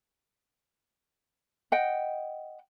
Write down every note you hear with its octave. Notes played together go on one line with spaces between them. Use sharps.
D#5 F#5 G5